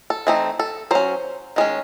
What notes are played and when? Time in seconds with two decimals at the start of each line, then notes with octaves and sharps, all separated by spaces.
0.10 A4
0.27 E3 A3 C4 D#4
0.59 A4
0.91 F#3 C#4 C5
1.56 D#3 G#3 C#4